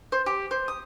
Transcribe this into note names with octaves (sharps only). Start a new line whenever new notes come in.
C5
G4
C5
D#6